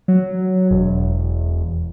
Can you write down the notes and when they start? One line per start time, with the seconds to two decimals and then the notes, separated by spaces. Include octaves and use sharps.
0.08 F#3
0.71 E1